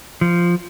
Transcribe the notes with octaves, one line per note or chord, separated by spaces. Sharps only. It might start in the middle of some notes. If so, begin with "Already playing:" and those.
F3